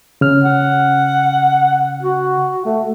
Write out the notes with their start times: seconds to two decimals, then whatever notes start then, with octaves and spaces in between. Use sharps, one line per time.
0.21 C#3 F6
0.44 F#5
2.02 F#4
2.65 A3